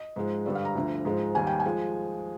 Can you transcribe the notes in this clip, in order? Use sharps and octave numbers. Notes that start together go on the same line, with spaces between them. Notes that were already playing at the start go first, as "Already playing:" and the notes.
Already playing: D#5
G#2 F3 G#3
G2 D3 G3 D5
F5
A#5
D2 D3 F3
G#2 F3 G#3
D#2 D#3 G3 G#5
G5
G#5
F3 G#3